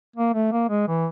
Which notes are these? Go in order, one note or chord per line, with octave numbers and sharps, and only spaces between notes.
A#3
A3
A#3
G#3
E3